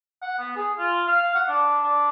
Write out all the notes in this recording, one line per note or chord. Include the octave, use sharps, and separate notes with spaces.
F#5
B3
G#4
F4
F5
F#5
D4
D4